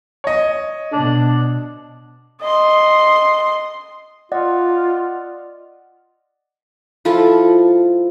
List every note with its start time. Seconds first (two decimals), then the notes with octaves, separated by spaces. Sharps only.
0.24 C#5 D#5
0.92 B2 D4
2.42 D#5 C6
4.32 F4 D5 D#5 F#5
7.05 F3 E4 F4 A4